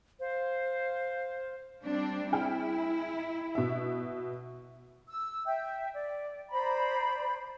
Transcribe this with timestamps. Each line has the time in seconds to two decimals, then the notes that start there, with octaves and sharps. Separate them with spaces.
0.20 C5 F5
1.85 G3 C4 D4
2.32 E4 G#4 G5 F6
3.55 B2 E5
5.08 E6
5.46 E5 G5
5.92 D5
6.50 C5 D5 A#5 B5